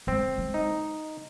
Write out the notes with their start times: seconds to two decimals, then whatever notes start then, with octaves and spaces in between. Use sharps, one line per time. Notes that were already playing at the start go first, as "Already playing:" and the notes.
0.07 G#3 C4
0.38 G#3
0.54 D#4